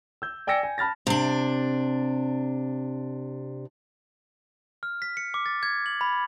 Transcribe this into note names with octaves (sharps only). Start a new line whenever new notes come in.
E6 G6
D5 G5 G#5 E6 A#6 C#7
G#5
A5 B5 F6 A6 A#6
C3 D4
F6
B6
C#7
D6
A6
G#6
F#7
B5